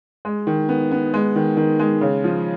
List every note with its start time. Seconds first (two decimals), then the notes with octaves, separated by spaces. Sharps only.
0.25 G#3
0.47 D#3
0.69 B3
0.92 B3
1.14 G#3
1.36 D#3
1.57 D#3
1.80 G#3
2.01 C#3
2.24 F3